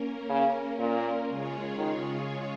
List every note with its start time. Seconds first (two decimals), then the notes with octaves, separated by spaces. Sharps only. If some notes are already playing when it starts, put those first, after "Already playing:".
Already playing: A#3 C#4 A#4
0.29 C#3
0.79 A#2
1.28 C#3 G#3 F4 G#4 C#5
1.77 D#3